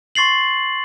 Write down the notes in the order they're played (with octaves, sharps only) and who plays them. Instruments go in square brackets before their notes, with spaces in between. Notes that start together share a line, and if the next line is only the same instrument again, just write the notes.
[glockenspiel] C6 C#6 A6 C7 F#7